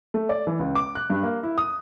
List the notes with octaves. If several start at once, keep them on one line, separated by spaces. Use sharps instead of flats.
A3
D5
E3
C#2
D6
F#6
G2
A#3
E4
D#6